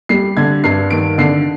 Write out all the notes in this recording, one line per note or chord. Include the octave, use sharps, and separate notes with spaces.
G3 C7
D3 G#6
G2 C7
D#3 D7
D3 C7